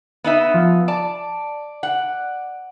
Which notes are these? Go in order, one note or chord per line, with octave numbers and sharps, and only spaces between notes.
B3 D#4 E5
F3
D5 A5
F#5